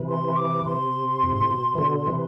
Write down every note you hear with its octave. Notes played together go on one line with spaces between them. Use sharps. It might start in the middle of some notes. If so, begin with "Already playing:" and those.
Already playing: C3 E3
C6
D6
C3 C6
F2
G#2
A2
B2
E3
B2 D3
C3 E3